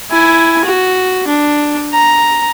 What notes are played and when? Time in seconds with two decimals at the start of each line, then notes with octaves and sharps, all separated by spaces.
0.11 E4 G#5
0.65 F#4
1.28 D4
1.93 A#5